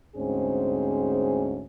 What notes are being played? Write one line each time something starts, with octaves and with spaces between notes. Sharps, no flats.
D2 G#2 C4 C#4 G#4 C5